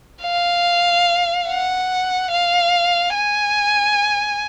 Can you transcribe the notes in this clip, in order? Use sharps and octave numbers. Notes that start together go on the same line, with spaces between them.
F5
F#5
F5
G#5